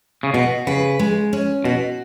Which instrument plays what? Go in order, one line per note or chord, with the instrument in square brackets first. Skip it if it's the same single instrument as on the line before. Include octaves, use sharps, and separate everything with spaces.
[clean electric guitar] C#3
[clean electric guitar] B2 [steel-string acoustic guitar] F#4
[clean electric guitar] C#3 [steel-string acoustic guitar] B4
[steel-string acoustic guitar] G#3
C#4
[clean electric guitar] B2 [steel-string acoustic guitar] F#4